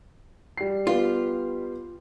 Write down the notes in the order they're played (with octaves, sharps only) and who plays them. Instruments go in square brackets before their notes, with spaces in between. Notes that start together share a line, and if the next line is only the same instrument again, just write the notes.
[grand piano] G3 C7
[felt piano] B3 G4 [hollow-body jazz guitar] F4